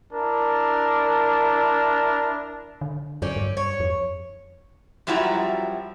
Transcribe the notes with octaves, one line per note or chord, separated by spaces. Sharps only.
D4 E4 A#4
D3
F#2 C4 C#4 D5
G2
C#5
F2
F#2 F3 G3 E4 F#4 A#5